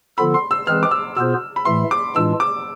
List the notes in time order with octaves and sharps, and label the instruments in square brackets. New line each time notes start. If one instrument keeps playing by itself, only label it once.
[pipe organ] D3 F3 B3 F4 A4 [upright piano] B5
[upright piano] C6
E6
[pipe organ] E3 G#3 C4 G#4 B4 [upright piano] F6
[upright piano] D6
E6
[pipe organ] B2 B3 F4 G#4 C5 [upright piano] E6
[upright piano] B5
[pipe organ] A2 E3 A3 [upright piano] C6
[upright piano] D6
[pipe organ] A2 E3 G#3 D4 F4 [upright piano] E6
[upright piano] D6